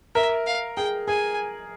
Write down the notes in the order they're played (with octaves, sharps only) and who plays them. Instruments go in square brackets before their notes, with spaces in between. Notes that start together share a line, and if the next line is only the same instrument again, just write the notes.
[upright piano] A#4 [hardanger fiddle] E5
[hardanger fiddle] F5
[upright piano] G#4 [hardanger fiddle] G5
[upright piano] G#4 [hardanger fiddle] G#5